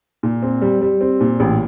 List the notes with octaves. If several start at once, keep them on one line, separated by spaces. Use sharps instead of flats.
A#2
C4
G3
G3
C4
A#2
A1